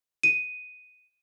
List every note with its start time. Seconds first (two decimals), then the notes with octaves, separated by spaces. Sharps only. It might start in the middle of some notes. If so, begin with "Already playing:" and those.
0.23 D#7